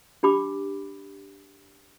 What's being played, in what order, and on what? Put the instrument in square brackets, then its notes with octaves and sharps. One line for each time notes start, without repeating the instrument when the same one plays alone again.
[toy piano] D4 G4 B5 D6